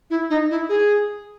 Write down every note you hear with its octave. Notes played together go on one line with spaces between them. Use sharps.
E4
D#4
E4
G#4